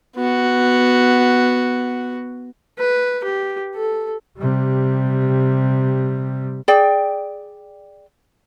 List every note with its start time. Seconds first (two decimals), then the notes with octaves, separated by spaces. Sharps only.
0.16 B3 F#4
2.79 B4
3.24 G4
3.75 A4
4.38 C3 G3
6.68 G#4 D5 G5